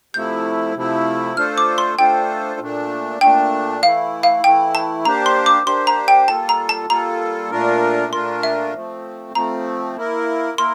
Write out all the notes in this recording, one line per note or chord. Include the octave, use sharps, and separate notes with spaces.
C3 F3 A3 E4 G6
C3 F3 A3 E4
A3 D4 F4 A4 C5 F6
D6
C6
A3 D4 F4 A4 C5 G5
A#2 A3 D4
A#2 A3 D4 G5
E3 A3 E4 F5
F5
E3 A3 E4 G5
A5
A#3 D4 G4 C5 A#5
C6
D6
A#3 D4 G4 C5 C6
A#5
G5
G3 A#3 F4 A4 A5
A#5
A5
G3 A#3 F4 A4 A#5
A#2 A3 D4 F4 A#4
A#2 A3 D4 F4 A#4 C6
E5
F3 A3 C4
F3 A3 C4 A#5
A#3 E4 A#4
A#3 E4 A#4 C6